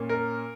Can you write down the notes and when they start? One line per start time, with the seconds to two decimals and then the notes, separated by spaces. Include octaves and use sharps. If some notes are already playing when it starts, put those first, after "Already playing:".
Already playing: A#2 A#3 C#4
0.09 A#4